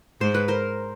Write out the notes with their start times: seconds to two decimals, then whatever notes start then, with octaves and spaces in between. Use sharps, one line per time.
0.21 G#2 C5
0.34 B4
0.48 A#4 C5